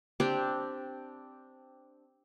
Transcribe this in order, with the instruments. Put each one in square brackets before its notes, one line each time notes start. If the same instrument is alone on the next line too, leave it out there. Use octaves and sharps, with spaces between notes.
[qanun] C4 D4 G4